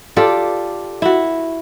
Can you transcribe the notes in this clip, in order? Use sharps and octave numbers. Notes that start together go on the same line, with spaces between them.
F4 G4 A4 D5
E4 F#4